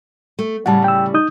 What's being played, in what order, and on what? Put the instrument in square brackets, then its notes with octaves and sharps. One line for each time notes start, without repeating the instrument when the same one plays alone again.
[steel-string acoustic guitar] A3
[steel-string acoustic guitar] A2 C#3 G3 [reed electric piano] F#5 A5
[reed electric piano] G5 E6
D#4 D#6 G6